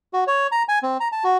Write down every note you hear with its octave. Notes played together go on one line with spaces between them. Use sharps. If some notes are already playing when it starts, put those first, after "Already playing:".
F#4
C#5
A#5
G#5
C4
A#5
A5
F#4